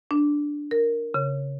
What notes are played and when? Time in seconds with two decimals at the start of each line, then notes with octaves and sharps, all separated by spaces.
0.11 D4
0.71 A#4
1.14 C#3